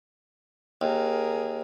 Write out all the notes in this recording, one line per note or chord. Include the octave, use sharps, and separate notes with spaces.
D#2 G#4 A#4